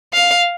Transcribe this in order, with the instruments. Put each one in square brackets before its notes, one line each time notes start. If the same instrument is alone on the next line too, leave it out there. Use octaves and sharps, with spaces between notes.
[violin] F5